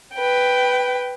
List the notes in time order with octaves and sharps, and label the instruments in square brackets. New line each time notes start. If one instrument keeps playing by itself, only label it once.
[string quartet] B4 G5